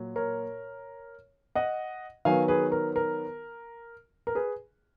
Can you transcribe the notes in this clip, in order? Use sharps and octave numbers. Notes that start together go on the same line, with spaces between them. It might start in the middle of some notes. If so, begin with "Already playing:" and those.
Already playing: A#2 F#3
A#4 C#5
D#5 F#5
D#3 F#3 B3 F5 G#5
G#4 B4
A#4
A#4
A#4
G#4 B4